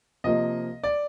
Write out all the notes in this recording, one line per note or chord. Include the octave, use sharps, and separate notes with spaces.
C3 F3 A#3 D#5
D5